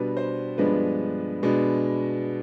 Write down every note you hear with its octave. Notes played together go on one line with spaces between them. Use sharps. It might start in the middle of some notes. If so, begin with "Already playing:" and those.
Already playing: B2 G3 D4 B4
C5
G2 F3 G#3 B3 D4 B4
B2 G#3 D4